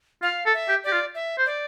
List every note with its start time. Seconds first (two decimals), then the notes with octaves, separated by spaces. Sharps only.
0.22 F4 F5
0.46 A4
0.53 E5
0.69 G4
0.84 G4 D5
0.92 F4
1.15 E5
1.38 C5
1.46 D5